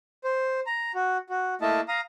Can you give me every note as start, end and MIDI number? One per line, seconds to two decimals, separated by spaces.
0.24 0.60 72
0.67 0.92 82
0.95 1.17 66
1.30 1.54 66
1.61 1.80 57
1.61 1.80 58
1.61 1.80 64
1.61 1.80 75
1.61 1.80 81
1.88 2.00 77
1.88 2.00 82
1.88 2.00 87